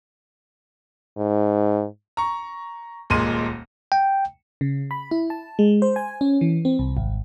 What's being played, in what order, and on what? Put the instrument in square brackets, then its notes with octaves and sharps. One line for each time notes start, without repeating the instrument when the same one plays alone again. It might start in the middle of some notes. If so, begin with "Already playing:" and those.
[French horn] G#2
[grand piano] A#5 C#6
D#1 A#2 G#3 C6 D#7
[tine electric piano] G5
[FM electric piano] C#3
B5
E4
A5
G#3
C5
G#5
C#4
E3
C4
C2
G#1